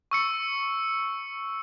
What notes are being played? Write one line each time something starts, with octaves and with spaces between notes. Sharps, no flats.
C#6 E6 C#7